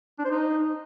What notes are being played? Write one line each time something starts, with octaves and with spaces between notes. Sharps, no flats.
D4
C5
D#4